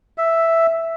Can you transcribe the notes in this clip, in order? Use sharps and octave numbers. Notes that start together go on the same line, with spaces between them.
E5